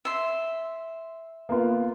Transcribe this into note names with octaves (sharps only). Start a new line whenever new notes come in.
E5 C6
A#3 B3 F4